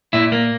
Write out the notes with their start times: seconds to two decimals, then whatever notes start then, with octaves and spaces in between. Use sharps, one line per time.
0.13 A#2 E4
0.32 A#3